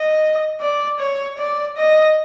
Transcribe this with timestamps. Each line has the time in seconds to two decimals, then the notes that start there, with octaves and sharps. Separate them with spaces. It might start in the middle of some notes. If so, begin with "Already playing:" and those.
Already playing: D#5
0.60 D5
1.00 C#5
1.38 D5
1.77 D#5